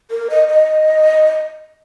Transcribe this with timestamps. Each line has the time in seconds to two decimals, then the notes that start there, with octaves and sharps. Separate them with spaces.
0.10 A#4
0.30 D#5
0.47 D#5